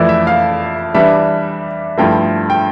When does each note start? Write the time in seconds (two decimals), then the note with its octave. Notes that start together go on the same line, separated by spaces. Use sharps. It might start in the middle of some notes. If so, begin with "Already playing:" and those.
Already playing: F2 E3 A3 E4 D5
0.09 E5
0.27 F5
0.94 E3 G3 D4 E5
1.98 G2 F3 A3 E4 G5
2.50 G5